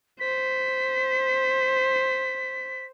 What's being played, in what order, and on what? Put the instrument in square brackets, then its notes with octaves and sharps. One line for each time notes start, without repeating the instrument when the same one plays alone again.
[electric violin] C5 [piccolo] B6